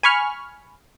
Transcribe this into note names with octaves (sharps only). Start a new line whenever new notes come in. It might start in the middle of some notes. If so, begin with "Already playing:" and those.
G#5 B5 C#6 F6